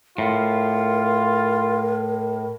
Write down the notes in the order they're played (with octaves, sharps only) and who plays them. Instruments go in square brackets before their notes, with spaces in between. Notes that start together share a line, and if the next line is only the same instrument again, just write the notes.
[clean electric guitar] A2 [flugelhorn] F4 [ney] A#4